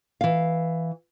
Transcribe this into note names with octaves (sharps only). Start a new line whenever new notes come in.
E3 F5